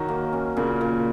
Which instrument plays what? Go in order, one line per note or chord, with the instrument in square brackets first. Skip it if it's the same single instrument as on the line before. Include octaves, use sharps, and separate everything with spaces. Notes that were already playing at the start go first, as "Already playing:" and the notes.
Already playing: [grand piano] D#3 [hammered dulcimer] F#3
[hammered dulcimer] A#3
C#4
[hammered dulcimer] A#2 [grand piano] C#3
[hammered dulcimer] A#2